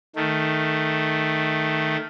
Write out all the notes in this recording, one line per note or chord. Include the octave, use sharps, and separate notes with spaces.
D#3 A3